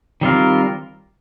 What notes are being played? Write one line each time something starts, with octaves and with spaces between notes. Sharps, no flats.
D#3 G3 C4 F4 A#4